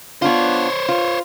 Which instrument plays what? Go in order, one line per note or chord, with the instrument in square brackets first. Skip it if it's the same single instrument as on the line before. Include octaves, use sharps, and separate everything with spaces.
[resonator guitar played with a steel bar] B3 D4 F4 [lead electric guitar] C5 C#5
[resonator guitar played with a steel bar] F4